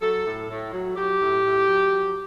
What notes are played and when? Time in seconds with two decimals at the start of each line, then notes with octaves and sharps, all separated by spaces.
0.01 F#3 A4
0.25 A2
0.49 A2
0.73 F#3
0.96 F#3 G4
1.20 A2
1.44 A2
1.67 F#3
1.91 F#3